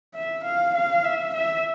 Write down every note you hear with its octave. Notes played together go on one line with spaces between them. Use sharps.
E5
F5
F5
E5
E5